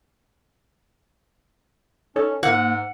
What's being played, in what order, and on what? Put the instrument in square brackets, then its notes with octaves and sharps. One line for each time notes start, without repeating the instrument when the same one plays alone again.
[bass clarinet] C#4 [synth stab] D#4 A4 C#5
[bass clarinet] G#2 [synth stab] A#3 [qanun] F#5